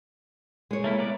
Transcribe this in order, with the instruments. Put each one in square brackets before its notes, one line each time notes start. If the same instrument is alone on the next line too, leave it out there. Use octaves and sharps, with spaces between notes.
[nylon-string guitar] G#3 C#5
[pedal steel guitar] A3 A#3 E4
B3 A#4 D5